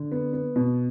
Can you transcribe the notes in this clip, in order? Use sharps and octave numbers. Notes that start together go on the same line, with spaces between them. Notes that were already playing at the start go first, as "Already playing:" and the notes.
Already playing: D3
B3
B3
B2